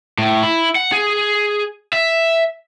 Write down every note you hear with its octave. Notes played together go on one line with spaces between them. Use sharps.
A2
E4
F#5
G#4
E5